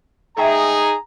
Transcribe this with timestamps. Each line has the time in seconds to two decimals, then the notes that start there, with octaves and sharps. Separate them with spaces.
0.37 A3 D#4 G#4 E5 G5 A#5